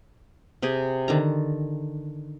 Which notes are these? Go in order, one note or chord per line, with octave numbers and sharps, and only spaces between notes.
C3 G4 G#4
D3 D#3 A#5